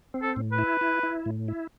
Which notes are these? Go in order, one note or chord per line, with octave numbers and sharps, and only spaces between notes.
C4
A4
A2
B4
E4
E4
E4
A2
E4